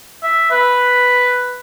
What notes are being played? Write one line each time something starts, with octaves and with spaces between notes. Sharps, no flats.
E5
B4